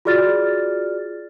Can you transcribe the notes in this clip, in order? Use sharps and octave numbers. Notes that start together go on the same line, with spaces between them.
F4 F#4 G#4 D5 F6 A6